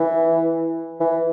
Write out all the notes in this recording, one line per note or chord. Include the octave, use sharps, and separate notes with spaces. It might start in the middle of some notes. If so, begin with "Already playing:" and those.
Already playing: E3
E3